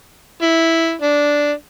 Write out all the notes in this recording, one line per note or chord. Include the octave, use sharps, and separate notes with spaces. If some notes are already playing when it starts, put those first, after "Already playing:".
E4
D4